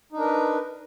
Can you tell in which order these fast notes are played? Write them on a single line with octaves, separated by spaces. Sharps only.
D#4 D4 A#4 B4